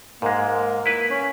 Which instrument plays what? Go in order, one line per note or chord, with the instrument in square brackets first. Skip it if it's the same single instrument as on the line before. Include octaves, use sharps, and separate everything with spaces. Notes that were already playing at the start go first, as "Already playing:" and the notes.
[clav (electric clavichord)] G#2 G#3 [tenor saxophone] A#3
[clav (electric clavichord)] E4 B4
[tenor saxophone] C#4